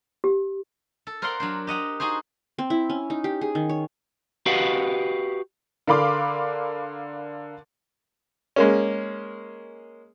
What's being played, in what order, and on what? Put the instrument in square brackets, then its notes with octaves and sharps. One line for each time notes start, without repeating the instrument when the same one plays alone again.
[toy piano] G4
[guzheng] A4
A#4 C5 D5 F5 F#5 C6
F#3 D4 C5
G4 D#5 F#5 A#5
D#4 F#4 G#4 C5
[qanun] C4
E4
C#4
D#4
G4
G#4
D#3
C#5
[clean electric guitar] F#4 G4 B4 D#5 F5 F#5
[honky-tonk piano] D3 A#4 F5 B5 C6 D6
[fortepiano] G#3 A#3 C#4